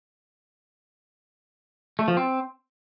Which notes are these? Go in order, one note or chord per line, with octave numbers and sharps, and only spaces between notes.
A3
F3
C4